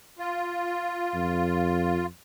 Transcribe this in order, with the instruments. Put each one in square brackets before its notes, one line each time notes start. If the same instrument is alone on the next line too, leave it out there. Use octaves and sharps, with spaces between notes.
[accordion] F4
[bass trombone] F2